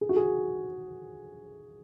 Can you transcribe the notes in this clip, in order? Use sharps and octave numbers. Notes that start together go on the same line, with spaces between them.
G#4
F#4
G#4